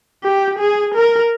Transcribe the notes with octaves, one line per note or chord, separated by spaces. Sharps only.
G4
G#4
A#4